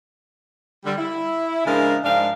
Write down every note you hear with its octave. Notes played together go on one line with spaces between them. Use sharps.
D3 G3
E4
C#3 F3 G#3 D4 A#4
G#2 F3 D4 A#4 F5